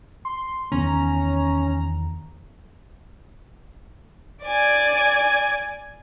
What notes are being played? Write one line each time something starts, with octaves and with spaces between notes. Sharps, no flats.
C6
E2 D#3 B3 C#4 A#5
D5 G#5